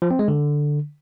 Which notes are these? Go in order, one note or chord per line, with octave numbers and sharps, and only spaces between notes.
F3
C4
G#3
D3